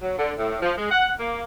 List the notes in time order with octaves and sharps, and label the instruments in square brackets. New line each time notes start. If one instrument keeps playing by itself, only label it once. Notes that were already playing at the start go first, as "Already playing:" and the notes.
[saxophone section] F#3
D3
A2
F3
G#3
F#5
A#3